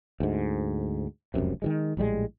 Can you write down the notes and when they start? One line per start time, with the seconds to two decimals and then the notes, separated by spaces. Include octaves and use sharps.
0.20 D2 G#2
1.34 F1 C#2 F#2 C3
1.62 D#3 F3 G#3
1.97 A#1 A2 G3 G#3